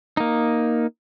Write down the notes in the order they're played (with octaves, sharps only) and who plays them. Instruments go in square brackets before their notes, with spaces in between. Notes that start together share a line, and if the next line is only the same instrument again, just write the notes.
[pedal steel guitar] A#3 D#4